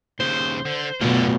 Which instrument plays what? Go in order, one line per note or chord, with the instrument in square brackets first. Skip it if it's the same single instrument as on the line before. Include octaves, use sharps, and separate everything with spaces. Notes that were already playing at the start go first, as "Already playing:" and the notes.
[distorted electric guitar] D#2 C#3 [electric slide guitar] C5
[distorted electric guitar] D3
[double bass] B2 [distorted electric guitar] D3 [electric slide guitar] F#3 A3 F4